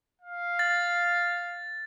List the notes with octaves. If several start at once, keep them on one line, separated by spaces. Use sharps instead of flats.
F5
A6